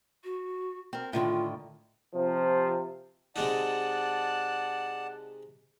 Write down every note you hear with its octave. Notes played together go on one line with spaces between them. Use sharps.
F#4
C4 A#4
A2 D3 D#3 F4
C3 F3
C3 G#3 D#4 D5 F#5 A5